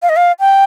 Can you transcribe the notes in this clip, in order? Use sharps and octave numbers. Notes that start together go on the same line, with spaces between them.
F5
D#5
F5
G5